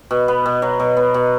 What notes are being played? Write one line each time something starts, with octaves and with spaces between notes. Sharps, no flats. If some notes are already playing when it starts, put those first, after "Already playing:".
B2
B3
B2
F#3
B2
B3
B2